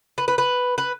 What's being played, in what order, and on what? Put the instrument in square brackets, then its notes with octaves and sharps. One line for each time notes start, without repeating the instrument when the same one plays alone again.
[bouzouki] B4
B4
B4
B4